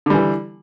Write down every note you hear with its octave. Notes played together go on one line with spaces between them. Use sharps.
D3 E3 G3